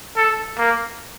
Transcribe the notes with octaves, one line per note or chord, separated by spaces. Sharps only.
A4
A#3